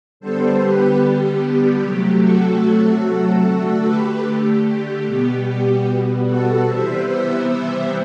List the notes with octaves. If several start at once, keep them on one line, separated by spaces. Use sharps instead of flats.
D3 G3 B3 A4 C5
G4 B4
G4
C3 F#3 A3
F#4 A4
D3 A3
G4 B4
G4
G4
B2 G3 B3
G4
F#4 A4
C3 E3 G3 B3 C5 E5
C5 E5
C5 E5